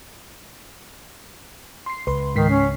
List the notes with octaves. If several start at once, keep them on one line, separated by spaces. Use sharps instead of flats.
C6 C7
C#2 B4 C6
G#2 D#3 B6 C7
C#4